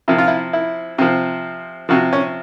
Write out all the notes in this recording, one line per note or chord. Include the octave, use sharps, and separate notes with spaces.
C3 F3 E4
F4
E4
E4
C3 F3
C3 F3 F#4
C#4